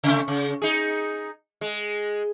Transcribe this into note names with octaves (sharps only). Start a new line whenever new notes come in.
C3 A3
C#3
D#4 G#4
G#3